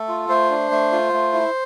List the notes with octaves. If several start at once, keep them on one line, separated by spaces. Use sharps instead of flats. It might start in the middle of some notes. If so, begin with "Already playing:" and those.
Already playing: A3 A4
F4
A3 C5
D4
A3
F4
A3
E4